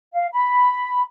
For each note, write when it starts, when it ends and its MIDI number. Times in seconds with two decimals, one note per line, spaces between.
0.13 0.26 77
0.32 1.02 83